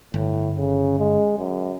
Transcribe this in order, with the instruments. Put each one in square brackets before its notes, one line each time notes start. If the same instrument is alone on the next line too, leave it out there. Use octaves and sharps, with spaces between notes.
[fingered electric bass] G1 [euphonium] A2
[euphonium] C#3
G#3
F#2